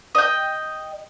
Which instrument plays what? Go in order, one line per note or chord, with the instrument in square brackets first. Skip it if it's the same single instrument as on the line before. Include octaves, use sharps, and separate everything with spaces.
[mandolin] D#5 G5